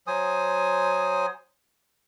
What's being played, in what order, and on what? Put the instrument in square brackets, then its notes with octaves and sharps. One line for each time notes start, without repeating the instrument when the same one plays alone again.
[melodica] F#3 C5 G#5 D#6